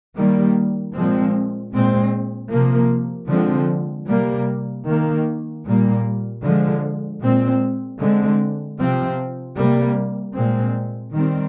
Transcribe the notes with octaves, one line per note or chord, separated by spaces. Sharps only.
D#3 G3 A#3
A#2 F3 G#3 C4
A#2 G#3 C4
C3 F3 A#3
D3 F3 G#3 C4
C3 G3 A#3
D#3 A#3
A#2 G3 A#3
D3 F3 G#3
A#2 G#3 C4
D3 G#3 C4
C3 F3 C4
C3 G3 A#3
A#2 G#3 C4
D#3 G3 C4